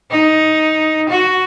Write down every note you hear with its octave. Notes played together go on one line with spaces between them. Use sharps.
D#4
F#4